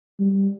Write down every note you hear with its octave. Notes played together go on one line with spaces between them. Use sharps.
G3